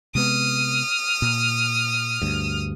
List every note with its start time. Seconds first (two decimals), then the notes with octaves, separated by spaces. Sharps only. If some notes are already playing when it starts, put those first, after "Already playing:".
0.15 C3 G#3 B3 D#6 F6
1.22 A#2
2.22 D2 G2